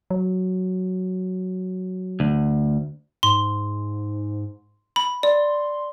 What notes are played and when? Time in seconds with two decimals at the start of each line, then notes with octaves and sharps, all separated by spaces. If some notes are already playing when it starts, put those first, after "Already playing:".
0.11 F#3
2.20 D2
3.23 G#2 C6
4.96 B5
5.23 D5 C6